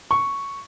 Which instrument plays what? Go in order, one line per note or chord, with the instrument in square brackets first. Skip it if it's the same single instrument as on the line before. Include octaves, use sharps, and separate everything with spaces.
[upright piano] C#6